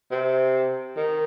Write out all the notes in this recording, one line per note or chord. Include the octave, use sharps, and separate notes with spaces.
C3
D#3